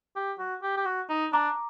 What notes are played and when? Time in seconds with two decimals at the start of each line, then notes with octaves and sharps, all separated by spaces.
0.16 G4
0.39 F#4
0.63 G4
0.77 G4
0.86 F#4
1.10 D#4
1.33 D4 A#5 D6